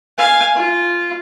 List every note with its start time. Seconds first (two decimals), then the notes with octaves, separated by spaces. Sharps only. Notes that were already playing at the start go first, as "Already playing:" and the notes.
0.18 F5 G#5
0.55 F4